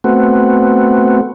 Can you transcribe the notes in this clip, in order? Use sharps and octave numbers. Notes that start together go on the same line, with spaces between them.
A3 B3 C4 F#4